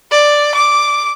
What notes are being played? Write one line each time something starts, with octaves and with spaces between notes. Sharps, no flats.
D5
D6